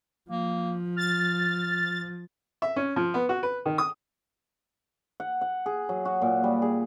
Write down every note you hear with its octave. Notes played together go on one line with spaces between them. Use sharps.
F3 A#3
F6 A6
E5
C#4
F3
B3
F#4
B4
D#3
D#6
F#5
F#5
G#4
F#3
F#4
A#2
G3
G#4